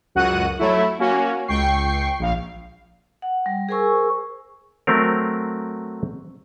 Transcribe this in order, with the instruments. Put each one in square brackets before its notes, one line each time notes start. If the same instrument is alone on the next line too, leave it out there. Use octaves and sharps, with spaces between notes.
[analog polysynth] C#2 F#2 F#4 F#5 F#6 D#7
F#3 A3 E4
A#3 C#4 F#4
C#2 G5 C#6 C7
A#1 F5
[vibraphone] F#5
G3
G#4 A#4 C5 G#5 C#6 E6
[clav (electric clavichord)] F#3 A3 C4 A#4